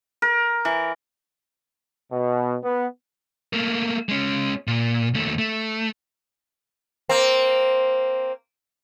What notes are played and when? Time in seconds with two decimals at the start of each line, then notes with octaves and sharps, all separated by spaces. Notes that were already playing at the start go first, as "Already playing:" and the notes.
0.22 A#4
0.65 E3
2.12 B2
2.64 B3
3.53 A3 A#3
4.09 G#3 C#4
4.67 A#2
5.14 D#2 A3
5.39 A3
7.09 A#3 C4